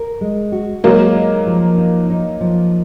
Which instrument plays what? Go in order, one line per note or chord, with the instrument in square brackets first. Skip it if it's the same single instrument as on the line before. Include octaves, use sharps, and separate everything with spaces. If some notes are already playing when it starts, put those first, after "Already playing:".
Already playing: [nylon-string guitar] A#4
G#3
F#4
[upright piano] F#3 A#3 [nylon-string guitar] G#3
[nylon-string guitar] D#4
F3
D#4
D#4
F3